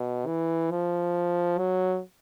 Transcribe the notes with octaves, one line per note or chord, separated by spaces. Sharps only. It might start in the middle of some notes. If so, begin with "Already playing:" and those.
Already playing: B2
E3
F3
F#3